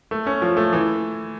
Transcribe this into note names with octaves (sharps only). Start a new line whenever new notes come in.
A3
C#4
F3
A3
E3